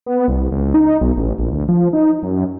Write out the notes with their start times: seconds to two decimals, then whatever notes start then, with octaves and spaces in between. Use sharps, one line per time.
0.06 B3
0.28 C2
0.51 C#2
0.74 D#4
1.01 B1
1.17 A1
1.38 A#1
1.51 D2
1.68 F3
1.93 D#4
2.23 F#2